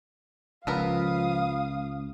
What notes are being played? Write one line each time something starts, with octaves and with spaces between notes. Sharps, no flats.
C#2 F3 B3 A#4 B4 F5 D#6